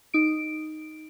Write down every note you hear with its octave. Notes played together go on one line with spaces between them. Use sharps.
D#4 D7